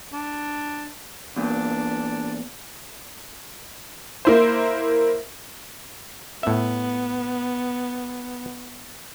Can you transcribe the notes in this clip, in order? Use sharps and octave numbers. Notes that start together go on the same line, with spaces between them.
D4
E2 A#2 D4
A#3 E4 C5
A2 B3 E5